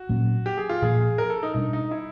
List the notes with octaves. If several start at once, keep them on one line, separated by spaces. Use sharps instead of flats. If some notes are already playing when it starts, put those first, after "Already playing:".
Already playing: F#4
A#2 F#3 A#3 C#4
G4
G#4
F4
A#2 F3 A#3 G#4
A#4
A4
D#4
B2 G3 B3 D4 D#4
D#4
E4